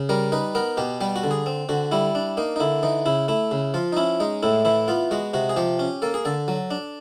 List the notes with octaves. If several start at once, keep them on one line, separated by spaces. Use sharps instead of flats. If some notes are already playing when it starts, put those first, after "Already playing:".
Already playing: C#3
G3 A#4
D#4 B4
B3 A#4
B2 G4
G3 G4
F#4
D3
G#4
C4
D3 F#4
G3 E4
D4
A#3 D#4
D#4
D3 E4
E3 D#4
C#3 E4
A3 E4
C#3
F3 F4
D#4
C#4 E4
G#3 D#4
A2 E4
E3 E4
B3 F4
G#3 F#4
C3 F#4
G#4
F3 G4
C#4
A#3 A4
G#4
D3 A4
F#3
D4